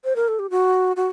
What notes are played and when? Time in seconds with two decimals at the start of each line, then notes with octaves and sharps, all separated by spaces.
0.05 C5
0.16 A#4
0.28 A4
0.39 G4
0.50 F#4
0.96 F#4